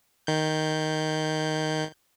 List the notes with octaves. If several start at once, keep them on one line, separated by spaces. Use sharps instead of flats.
D#3 G6